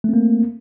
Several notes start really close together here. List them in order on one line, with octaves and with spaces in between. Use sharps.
A3 C4 A#3